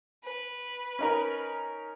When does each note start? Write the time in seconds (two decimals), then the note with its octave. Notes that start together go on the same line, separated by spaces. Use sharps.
0.24 B4
0.99 C#4 D#4 A#4